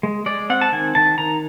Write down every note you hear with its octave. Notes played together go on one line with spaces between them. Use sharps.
G#3
G#3 D5
C4 F#5
A5
D#3 G#5
D#3 A5
D#3 A#5